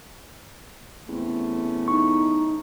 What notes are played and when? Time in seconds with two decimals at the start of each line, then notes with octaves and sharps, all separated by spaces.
1.09 E2 A3 C4 C#4
1.88 D#4 C#6